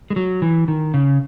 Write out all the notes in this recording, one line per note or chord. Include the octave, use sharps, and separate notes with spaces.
G#3
F#3
E3
D#3
C#3